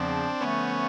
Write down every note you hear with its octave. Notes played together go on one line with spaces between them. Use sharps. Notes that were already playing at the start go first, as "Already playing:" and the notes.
Already playing: E2 C#3 F3 C4 D4
D3 F3 A3 B3 C#4